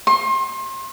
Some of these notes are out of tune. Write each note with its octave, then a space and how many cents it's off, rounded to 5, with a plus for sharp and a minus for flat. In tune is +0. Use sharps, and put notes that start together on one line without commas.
C6 +30